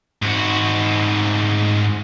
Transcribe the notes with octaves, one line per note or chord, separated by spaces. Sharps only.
G#2 F#4